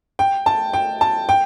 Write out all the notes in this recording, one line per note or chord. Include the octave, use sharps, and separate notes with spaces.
G5
A5
G5
A5
G5